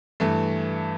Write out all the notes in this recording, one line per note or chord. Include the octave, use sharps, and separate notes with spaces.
G2 E3 A3